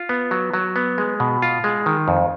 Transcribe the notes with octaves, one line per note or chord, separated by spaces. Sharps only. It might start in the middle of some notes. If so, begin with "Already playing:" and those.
Already playing: F4
B3
F#3
F#3
B3
G#3
B2
F4
G#3
D#3
F2